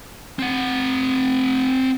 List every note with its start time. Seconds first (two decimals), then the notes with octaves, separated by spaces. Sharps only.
0.39 C4 F#5